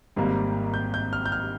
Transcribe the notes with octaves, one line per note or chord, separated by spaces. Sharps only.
G#1 G#2 G3 A#3
G6
G6
F6
G6
F6